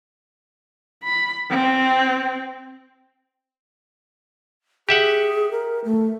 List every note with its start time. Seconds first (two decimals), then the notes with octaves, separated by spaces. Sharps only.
1.04 B5
1.50 C4
4.89 G4 G#4 E5 F#5
5.51 A#4
5.85 A3